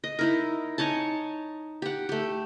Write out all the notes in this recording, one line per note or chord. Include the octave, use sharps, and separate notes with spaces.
D#5
D#4 E4 A#4
D#4 C#5 G#5 A5
G4 F#5
A3 G4